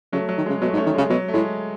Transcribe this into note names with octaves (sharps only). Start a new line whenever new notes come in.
C#3 F#3 A3
F#3
D#3
C#3 G#3
B2 F#3 A3
G#2
A3 C#4
D#3
C#3 G#3
B2 F#3
A3
A2 G#3